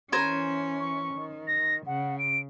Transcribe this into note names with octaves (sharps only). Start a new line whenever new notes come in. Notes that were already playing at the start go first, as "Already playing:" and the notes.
E3 C#4 A#4 C5 G#5
C#6
D#3
A#6
C#3 F#5
D7